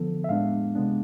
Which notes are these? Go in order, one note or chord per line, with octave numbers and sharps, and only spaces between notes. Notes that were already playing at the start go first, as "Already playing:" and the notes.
Already playing: D3 F3 B3 A4
E5
A2 G#3 B3 D4 F5
C3 G#3 B3 D4